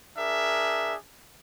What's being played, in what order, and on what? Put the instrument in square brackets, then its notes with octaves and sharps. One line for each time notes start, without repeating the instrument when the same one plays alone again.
[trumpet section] D4 G#4 A#4 E5